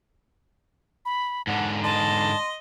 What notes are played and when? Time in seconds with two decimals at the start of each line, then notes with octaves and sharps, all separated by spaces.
1.05 B5
1.47 G#2 D3 F#5
1.84 D#5 A5 C6